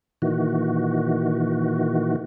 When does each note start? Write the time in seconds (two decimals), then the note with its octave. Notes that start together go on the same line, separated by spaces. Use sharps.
0.22 A#2 D#3 E3 F#4